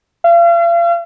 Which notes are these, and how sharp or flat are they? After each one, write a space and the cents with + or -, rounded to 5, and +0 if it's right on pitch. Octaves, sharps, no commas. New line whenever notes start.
F5 -40